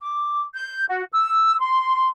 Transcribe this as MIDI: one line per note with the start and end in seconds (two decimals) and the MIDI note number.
0.01 0.43 86
0.55 0.85 91
0.90 1.04 66
1.12 1.59 88
1.60 2.08 84